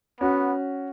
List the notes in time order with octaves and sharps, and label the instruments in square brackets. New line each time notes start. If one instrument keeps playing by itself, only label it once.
[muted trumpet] B3 [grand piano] C#4 F#4